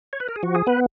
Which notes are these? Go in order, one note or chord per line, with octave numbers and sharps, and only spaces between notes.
C#5
B4
A#4
G#4
F3 F#4
G#4
B3 B4